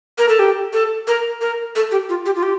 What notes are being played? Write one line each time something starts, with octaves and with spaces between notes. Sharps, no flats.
A#4
A4
G4
A4
A#4
A#4
A4
G4
F4
G4
F4
G4